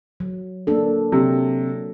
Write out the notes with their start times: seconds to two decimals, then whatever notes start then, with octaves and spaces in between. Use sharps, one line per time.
0.20 F#3
0.67 A#3 D4 A4
1.12 C3 F#3